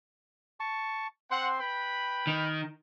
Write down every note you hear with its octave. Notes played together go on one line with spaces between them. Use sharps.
A5 C#6
C4 C5 F#5 C6
B4 G5 B5
D#3